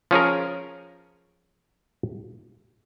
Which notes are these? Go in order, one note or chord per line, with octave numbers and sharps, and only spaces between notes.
F3 C#4 G#4 A#4